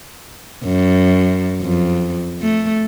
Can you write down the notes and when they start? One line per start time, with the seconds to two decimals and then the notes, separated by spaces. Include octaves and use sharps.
0.64 F#2
1.61 F2
2.41 A3